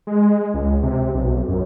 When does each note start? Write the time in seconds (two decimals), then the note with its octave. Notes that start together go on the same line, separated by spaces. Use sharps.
0.07 G#3
0.54 C#2
0.83 C3
1.15 B1
1.48 F#2